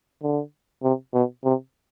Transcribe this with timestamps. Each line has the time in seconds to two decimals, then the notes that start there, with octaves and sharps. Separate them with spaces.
0.22 D3
0.83 C3
1.14 B2
1.44 C3